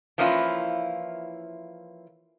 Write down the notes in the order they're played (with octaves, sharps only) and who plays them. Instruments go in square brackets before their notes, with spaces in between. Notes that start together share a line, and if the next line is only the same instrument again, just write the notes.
[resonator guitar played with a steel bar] E3 F3 A#3 C#4 E4 F4